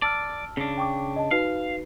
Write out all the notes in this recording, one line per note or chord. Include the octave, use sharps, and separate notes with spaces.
D5 A5 E6 F6
C#3 D4
G5 C#6 D6
D#5 A5
D#4 F#4 B4 F5